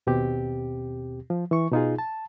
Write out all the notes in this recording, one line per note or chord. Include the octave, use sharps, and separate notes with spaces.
D#2 B2 C4 G4
F3
E3 C#6
B2 D#4 F4 G#4
A5